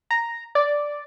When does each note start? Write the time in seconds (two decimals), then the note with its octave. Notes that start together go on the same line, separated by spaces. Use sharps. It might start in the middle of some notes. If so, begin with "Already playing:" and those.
0.11 A#5
0.55 D5